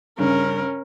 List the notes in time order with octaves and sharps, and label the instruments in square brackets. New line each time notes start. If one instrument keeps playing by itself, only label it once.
[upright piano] G2 C#3 [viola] C#4 A#4